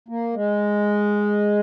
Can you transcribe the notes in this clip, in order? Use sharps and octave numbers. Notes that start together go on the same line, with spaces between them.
A#3
G#3